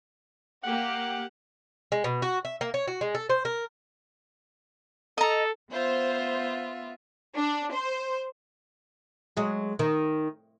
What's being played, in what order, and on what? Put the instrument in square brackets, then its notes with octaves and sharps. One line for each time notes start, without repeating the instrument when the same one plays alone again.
[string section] A#3 G4 [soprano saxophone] F#5
[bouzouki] G#3
B2
F#4
E5
A#3
C#5
F#4
G#3
A4
C5
A#4
[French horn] A4 [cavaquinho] D#5 A#5
[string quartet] B3 F4 E5 [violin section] C5
[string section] D4
C5
[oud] F#3 G#3
D#3